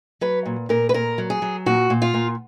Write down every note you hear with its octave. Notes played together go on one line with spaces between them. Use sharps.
F#3 B4
A#2
A#2 A#4
B4
A#2 A#4
F#3
G#4
F#3
A#2 F#4
A#2
F4
A#2